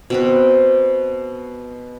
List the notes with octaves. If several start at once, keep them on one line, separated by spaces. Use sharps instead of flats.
B2 C4 B4